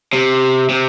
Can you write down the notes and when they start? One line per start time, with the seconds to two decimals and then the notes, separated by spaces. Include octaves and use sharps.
0.13 C3
0.69 C3